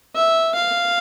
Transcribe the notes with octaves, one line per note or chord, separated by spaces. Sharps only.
E5
F5